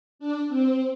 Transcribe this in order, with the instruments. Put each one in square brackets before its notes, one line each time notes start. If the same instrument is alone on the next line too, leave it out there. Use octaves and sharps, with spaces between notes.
[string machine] D4
C4